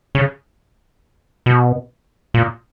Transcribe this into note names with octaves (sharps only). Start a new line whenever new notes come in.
C#3
B2
A#2